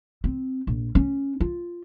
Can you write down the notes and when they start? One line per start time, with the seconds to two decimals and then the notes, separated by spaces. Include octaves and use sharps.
0.24 C4
0.67 A#1
0.95 C#4
1.40 F4